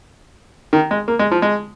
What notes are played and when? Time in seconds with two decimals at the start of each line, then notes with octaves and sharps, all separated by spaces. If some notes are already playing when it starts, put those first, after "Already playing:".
0.73 D#3
0.91 G#3
1.08 A#3
1.19 G#3
1.31 F3
1.42 G#3